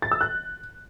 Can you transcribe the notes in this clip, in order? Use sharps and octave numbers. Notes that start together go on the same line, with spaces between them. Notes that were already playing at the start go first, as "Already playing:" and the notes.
A6
E6
F#6